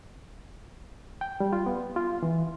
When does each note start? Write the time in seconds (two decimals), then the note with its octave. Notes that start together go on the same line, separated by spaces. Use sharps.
1.21 G5
1.40 G3
1.53 F4
1.66 B3
1.96 F4
2.23 E3